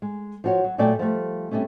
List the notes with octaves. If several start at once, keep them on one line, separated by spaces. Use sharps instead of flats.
G#3
F3 F#4 C#5
F#3
A#2 F#3 A3 D5 G5 G#5
F3 G3 A3
C3 E3 G3 A3 C#4